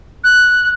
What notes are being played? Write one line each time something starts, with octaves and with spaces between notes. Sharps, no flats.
F#6